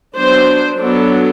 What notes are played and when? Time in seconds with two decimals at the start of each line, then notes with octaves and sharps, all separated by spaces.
0.16 F#3 B3 D4 C5
0.80 F#3 B3 D4 A4